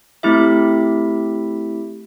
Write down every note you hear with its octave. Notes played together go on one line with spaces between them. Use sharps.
A3 C4 E4 G4 E5